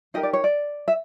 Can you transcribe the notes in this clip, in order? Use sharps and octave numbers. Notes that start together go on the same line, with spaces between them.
D#4 G4 A#4 D#5
D5
C#5
D5
E5